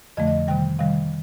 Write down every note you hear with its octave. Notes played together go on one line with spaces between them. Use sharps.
F2 D3 F3 A3 D#5
D#5
C3 D#3 G3 G5
C3 D#3 G3 F5